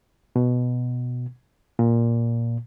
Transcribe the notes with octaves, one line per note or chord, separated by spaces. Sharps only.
B2
A#2